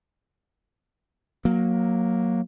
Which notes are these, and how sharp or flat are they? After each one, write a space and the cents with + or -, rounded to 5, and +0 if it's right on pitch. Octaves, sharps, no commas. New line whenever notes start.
F#3 -15 A#3 +0